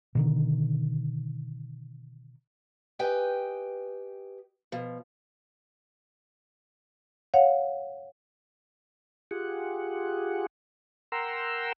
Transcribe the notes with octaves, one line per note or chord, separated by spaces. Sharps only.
B2 D3 D#3
G4 B4 D#5 G5 G#5
B2 F3
C#5 F5 F#5
F4 G4 G#4 F#5
A#4 F#5 G5 A#5 C6 E6